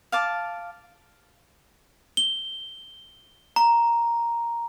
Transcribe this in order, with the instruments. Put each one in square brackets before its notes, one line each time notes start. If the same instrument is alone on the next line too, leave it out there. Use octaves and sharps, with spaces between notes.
[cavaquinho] F5 A5 D6
[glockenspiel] G7
A#5